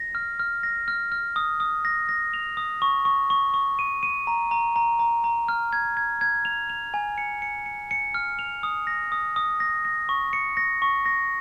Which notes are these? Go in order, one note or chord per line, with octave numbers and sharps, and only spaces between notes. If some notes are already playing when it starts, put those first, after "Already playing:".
Already playing: A#6
F6
F6
A#6
F6
F6
D#6
D#6
A#6
A#6
F7
D#6
C#6
C#6
C#6
C#6
D#7
D#7
A#5
A#5
A#5
A#5
A#5
F6
G#6
G#6
G#6
F7
F7
G#5
C#7
C#7
C#7
C#7
F6
F7
D#6
A#6
D#6
D#6
A#6
A#6
C#6
C#7
A#6
C#6
A#6